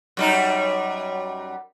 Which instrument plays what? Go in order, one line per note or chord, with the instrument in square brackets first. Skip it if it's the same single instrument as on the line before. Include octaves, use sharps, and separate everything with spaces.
[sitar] F#2 G3 D#4